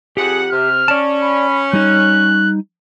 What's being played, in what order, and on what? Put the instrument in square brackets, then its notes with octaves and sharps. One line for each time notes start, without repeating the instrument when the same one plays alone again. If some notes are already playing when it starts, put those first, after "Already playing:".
[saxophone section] F2 F#5 [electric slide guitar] G4 [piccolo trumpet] G#4
[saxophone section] C3 [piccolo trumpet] F6
[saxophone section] C#4 [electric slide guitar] D5 A5
[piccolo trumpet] B5
[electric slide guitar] G3 D#4 [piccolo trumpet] F#6